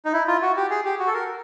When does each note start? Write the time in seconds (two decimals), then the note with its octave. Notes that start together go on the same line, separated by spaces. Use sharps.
0.05 D#4
0.13 E4
0.27 F4
0.42 F#4
0.57 G4
0.71 G#4
0.85 G4
0.99 F#4
1.07 A4
1.14 A#4